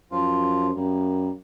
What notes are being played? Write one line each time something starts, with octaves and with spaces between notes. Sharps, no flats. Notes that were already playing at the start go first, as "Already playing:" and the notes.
F#2 F3 F4
F#2 G3 A#3